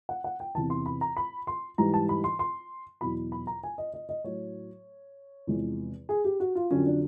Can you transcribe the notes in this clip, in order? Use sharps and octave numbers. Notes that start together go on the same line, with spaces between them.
F#5
F#5
G5
E2 C3 E3 A5
C6
B5
A#5
B5
C6
G#2 E3 G3 A#5
A5
B5
C6
C6
E2 B2 F#3 B5
B5
A#5
G#5
D#5
D#5
D#5
A2 F#3 C#5
E2 C3 F3 G#3
G#4
G4
F#4
F4
F2 D3 F#3 C#4
D4